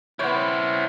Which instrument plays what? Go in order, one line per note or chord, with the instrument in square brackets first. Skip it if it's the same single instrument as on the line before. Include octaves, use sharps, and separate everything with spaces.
[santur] B3 C#5 [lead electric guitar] E4 C5